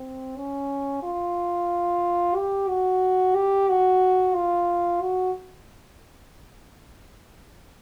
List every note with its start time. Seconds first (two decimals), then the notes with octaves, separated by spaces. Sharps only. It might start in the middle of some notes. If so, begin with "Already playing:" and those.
Already playing: C4
0.37 C#4
1.03 F4
2.36 G4
2.68 F#4
3.35 G4
3.69 F#4
4.36 F4
5.01 F#4